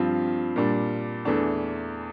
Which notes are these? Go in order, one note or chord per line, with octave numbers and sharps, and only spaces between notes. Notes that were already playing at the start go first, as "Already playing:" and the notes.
Already playing: G2 F3 C4 F4
A#2 G3 D4
E2 E3 A3 D4